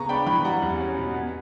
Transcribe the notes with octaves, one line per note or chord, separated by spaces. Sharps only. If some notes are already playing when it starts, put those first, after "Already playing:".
Already playing: C#3 B3 A#5 C#6
D4 G5 B5
E3 G5 B5
G3 F#5 A#5
E2
C#4
B2
B3